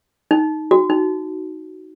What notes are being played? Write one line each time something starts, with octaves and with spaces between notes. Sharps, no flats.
D#4
F#4
D#4